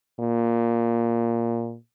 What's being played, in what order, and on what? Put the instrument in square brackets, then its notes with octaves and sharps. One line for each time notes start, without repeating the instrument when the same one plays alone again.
[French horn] A#2